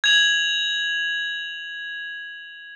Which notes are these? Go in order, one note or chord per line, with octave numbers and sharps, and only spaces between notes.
G#6 F7 F#7